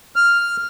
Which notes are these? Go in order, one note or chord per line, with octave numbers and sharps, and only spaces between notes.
F6